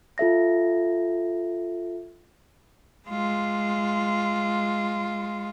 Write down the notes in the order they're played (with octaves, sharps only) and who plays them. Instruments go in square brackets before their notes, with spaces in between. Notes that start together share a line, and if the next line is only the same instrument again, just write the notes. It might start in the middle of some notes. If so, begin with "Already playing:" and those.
[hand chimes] F4 A4 E5 A#6
[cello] G#3 F4